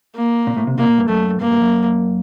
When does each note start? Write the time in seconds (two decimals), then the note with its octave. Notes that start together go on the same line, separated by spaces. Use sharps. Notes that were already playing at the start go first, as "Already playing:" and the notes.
0.16 A#3
0.47 A#2
0.56 A2
0.67 C3
0.78 C3 A#3
0.88 A#2
0.98 G2
1.09 F#2 A3
1.40 G2 A#3
1.51 G2
1.61 F#2